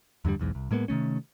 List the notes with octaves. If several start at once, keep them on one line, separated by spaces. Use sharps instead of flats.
E2 G2 D3 G3
B1 E2 G#2
C2
A2 G#3 A#3 B3
C3 D#3 A3 C#4